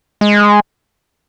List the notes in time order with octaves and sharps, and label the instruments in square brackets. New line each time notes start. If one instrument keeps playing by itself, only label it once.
[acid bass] G#3